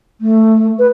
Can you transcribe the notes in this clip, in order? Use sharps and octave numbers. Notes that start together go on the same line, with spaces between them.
A3
B4